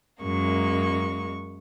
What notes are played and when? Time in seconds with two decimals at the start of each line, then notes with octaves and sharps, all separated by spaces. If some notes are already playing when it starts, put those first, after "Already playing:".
0.23 F#2 G#3 A#3 C#6